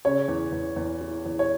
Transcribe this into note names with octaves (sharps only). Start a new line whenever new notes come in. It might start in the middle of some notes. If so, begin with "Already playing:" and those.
C#3 C#5
E2
E2
E2
E3
E2
C#5